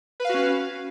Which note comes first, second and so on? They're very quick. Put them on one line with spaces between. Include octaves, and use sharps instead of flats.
B4 F5 F#4 C#4